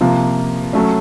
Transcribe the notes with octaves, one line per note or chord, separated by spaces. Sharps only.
C3 F3 A#3
F#3 A3 C#4